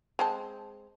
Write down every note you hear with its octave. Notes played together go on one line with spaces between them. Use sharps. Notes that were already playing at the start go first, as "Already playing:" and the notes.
G#3 C4 A5